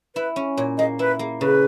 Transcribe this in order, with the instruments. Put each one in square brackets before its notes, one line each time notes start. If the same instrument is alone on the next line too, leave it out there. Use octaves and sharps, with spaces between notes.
[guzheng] E4 [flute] B4
[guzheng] C#4
[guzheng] A#2 [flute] C#5
[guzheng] A#3 [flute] D#5
[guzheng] E4 [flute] B4
[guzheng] A#3
[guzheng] C#3 [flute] B4